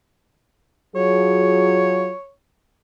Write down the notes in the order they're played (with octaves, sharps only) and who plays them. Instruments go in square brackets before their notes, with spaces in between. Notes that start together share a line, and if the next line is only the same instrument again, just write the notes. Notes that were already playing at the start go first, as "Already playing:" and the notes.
[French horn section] F#3 F4 G#4 [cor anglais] C#5